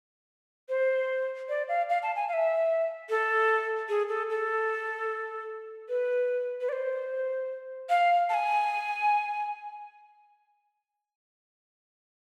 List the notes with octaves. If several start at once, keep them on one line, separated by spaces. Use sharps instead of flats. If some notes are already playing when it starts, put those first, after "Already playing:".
C5
D5
F5
F5
A5
G#5
F5
E5
A4
G#4
A4
A4
B4
B4
D5
C5
F5
A5
G#5